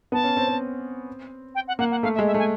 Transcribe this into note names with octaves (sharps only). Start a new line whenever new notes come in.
B3 A5
C#4
C4
C4
G5
F#5
A#3 F#5
F#5
A3 F5
E5
G#3
E5
A3 G#5